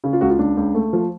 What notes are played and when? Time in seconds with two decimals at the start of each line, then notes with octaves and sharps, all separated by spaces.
0.04 C#3 G#4
0.13 F4
0.21 C#2 F#4
0.30 F4
0.39 C#2 D4
0.57 C#2
0.74 A3
0.93 F3